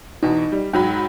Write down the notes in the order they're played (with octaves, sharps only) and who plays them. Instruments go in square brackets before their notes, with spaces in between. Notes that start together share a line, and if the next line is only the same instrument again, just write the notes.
[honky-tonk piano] E2 B2 [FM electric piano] D#4
[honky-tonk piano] G3
[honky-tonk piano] G#2 F#3 B5 [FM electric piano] G5